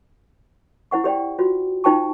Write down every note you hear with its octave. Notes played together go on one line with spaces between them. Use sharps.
E4 C5 F#5 C#6
G4 C5 D5 F5 G5
F4 F#4 C5
D#4 F4 C5 G5 A5 C#6